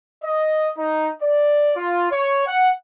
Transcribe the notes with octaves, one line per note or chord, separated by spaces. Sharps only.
D#5
D#4
D5
F4
C#5
F#5